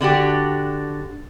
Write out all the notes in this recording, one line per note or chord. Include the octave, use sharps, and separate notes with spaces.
D3 D4 F#4 G4